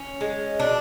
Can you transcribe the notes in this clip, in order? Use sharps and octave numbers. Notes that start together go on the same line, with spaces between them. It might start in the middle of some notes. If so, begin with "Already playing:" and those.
Already playing: C#4
G#3
B2 D4